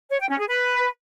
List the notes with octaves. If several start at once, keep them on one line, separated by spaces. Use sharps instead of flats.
C#5
G5
C#4
G#4
B4